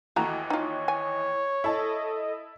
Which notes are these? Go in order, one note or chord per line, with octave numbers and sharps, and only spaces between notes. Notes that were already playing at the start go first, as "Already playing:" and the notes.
D#2 E3 A3 F#4 D#5 A#5
D#4 F4 C#5
G#5
E4 A4 D#5 A5